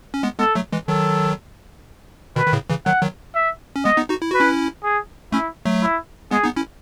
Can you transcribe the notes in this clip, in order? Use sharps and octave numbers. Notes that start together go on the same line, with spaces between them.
C#4
G#3 B3
G#3 B3 A4
F#3 A3
E3 G#3
D#3 F#3 A4
B2 D#3 B4
D#3
A2 C#3
C#3 E3
D#3 F#3 F#5
D#3 F#3
E5
C#4
G#3 B3 D#5
B3 D#4
D#4 F#4
E4
F#4 B4
C#4 E4
G#4
A3 C#4 E4
F#3 A3
E4
G#3 B3 G#4
B3 D#4
C#4 E4